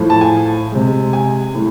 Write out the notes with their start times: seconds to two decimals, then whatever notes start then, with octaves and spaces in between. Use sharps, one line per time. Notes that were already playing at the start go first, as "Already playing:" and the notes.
Already playing: A2 F3 A3
0.10 A5
0.21 G#5
0.72 C3 G#3
1.13 G#5
1.55 A2